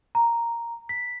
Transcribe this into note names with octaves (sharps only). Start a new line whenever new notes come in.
A#5
B6